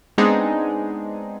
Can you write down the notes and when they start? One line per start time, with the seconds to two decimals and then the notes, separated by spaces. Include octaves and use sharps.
0.18 G#3 B3 C4 D4 D#4 G#4